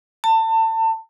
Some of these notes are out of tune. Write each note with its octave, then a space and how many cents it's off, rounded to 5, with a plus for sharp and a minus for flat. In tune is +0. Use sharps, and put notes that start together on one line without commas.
A5 +30